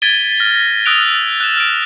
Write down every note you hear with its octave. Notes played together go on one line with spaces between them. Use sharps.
G#6 A6 B6 D7 D#7 G7
F6 A#6
D#6 E6 F#6 D7 F7
A6
F#6 E7
F6 D7